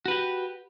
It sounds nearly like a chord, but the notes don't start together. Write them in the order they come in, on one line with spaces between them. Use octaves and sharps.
F#4 B4 G4